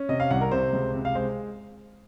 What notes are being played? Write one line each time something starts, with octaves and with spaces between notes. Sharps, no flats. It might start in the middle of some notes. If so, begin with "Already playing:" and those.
Already playing: C#4
C3 D#5
F5
C2 F#5
A#4
C3 C5
C#2
C3
F5
G#3 C5